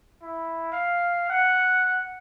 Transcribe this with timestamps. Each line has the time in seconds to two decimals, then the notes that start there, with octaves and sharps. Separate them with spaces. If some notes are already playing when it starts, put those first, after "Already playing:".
0.22 E4
0.72 F5
1.30 F#5